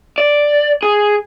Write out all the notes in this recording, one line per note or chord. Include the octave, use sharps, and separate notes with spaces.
D5
G#4